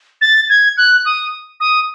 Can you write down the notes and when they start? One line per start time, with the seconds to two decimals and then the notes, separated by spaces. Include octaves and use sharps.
0.21 A6
0.49 G#6
0.77 F#6
1.05 D#6
1.60 D#6